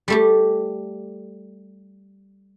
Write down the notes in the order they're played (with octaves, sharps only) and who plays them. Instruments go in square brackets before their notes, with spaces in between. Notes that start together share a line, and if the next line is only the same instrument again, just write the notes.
[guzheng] G3 A3 G4